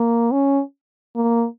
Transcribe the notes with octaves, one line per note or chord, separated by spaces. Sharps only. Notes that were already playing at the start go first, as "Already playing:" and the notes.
Already playing: A#3
C#4
A#3